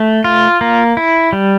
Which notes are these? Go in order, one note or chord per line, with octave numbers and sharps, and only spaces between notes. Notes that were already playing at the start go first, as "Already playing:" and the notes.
Already playing: A3
F4
A#3
E4
G3